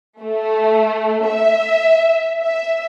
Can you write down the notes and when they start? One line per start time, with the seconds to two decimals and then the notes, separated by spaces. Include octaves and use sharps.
0.21 A3
1.27 E5
2.42 E5